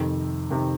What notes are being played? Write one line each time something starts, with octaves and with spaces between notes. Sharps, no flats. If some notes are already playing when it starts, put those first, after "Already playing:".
Already playing: F2 C3 D#3
C3 D#3